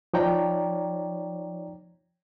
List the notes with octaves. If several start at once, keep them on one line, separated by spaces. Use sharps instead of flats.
F3 D#4 C#5 D5 G5 A#5